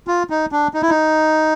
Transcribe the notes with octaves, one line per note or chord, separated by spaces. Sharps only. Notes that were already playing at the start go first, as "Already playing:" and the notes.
F4
D#4
D4
D#4
E4
D#4